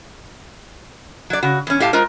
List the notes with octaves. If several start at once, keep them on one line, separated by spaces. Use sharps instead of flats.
F#3 D5
C#3 F#4
E2 C#4
A2 G4 F5 A5
G#3 F4 A#4 C5